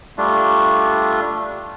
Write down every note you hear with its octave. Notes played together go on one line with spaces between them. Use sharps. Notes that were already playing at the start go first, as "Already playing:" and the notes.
G3 A3 D4 F4